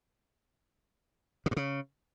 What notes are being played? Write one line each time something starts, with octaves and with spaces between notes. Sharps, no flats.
C#3
G2
C#3